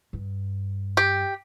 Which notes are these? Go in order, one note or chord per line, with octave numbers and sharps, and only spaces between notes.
G2
G4